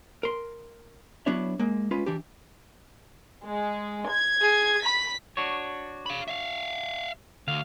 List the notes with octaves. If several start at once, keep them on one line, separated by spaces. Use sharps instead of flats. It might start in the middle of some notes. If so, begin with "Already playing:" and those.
A#4 C6
F#3 B3 D4 E4 C#5 E5
G#3 A#3
G#3 C#4 F4 B4
E3 D4 G4
G#3
G#6
G#4
B5 B6
D4 F#4 C#5
F5 B5
E5 F5
D2 F5